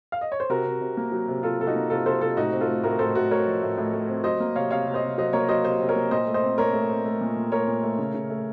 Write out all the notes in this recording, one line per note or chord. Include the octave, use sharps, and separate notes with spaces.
F5
D#5
C#5
C5
C3 F#4 A#4
C3
C3
A#3
F#3
C3
C3 F4 A4
C3 A4
D#4 F#4
A#3
C3 F4 A4
C3 A4 C5
C3 F4 A4
A2 D#4 F#4
C4
F4 A4
A3
A2 F#4 A#4
A2 A4 C5
A2 F#4 A#4
A3 A#4 C#5
F3
A2
A2
A3
C4
F#3 C5 D#5
A#3
C3 C#5 F5
C3 C#5 F5
C3
C5 D#5
C3
F#3 C5 D#5
A#3 A#4 C#5
F#3 C5 D#5
C3 C5 D#5
C3
A#4 C#5
A#3
A#2 C5 D#5
A3
C5 D#5
C4
A#2 A#4 C#5
A3
C4
A3
A#2
A#2
A3 A#4 C#5
A#2
A3
C#3
C#3
A3